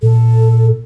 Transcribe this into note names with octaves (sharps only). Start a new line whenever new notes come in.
A#2 A4